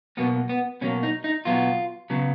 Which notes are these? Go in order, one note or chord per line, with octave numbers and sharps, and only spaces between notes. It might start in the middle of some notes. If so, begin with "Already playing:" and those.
B2 F#3 A#3 B3
B3
B2 F#3 A#3 C#4
D#4
D#4
B2 F#3 B3 F4
C#3 F#3 B3